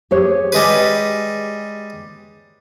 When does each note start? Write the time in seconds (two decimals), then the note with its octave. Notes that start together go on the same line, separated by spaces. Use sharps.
0.11 G4 G#4 C#5
0.52 G3 G#3 B4